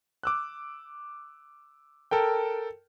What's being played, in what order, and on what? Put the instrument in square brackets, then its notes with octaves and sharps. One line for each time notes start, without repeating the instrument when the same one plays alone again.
[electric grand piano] D6 E6 F#6
A4 A#4 G5